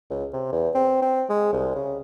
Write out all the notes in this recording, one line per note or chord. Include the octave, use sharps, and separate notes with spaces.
C#2
C3
E2
C4
C4
G#3
C2
C#3